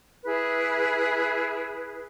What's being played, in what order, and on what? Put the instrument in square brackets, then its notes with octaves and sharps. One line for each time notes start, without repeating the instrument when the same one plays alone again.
[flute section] E4 G#4 B4